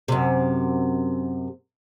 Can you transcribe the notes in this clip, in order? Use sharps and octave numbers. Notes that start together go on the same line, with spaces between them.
F#2 C3